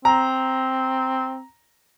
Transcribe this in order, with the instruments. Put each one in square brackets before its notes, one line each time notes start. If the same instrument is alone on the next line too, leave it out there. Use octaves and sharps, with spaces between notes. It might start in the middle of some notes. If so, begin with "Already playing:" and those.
[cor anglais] C4 [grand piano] A#5